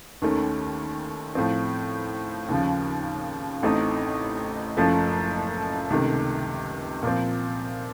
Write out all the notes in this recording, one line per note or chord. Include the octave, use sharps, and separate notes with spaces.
D#2 D#3 A3 C#4
A2 F3 C4
D#2 C#3 F3
A1 A2 A3 C4 D#4
F#1 F#2 F3 A3
C#2 C3 D#3 A3
A#2 F3 C4